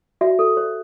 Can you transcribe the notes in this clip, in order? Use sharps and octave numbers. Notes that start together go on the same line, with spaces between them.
F#4 E5
A4
C5